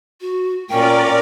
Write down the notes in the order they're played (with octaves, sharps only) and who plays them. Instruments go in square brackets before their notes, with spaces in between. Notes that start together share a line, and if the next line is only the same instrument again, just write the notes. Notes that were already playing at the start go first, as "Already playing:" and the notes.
[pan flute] F#4
[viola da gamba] A#2 C#4 F4 [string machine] A#4 D5 [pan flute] G5